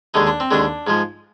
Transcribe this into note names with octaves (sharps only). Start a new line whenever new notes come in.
D#2 D3 G#3 D#4
D4
C4
D#2 D3 G#3 D4
G#2 F3 G#3